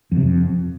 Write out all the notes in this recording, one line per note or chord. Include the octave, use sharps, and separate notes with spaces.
F2
C3
F2